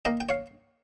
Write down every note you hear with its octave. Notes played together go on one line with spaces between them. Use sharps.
A#3 D#5 G5
G5
C#5 F5